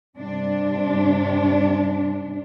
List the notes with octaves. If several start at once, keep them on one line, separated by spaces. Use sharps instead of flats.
G2 C3 D4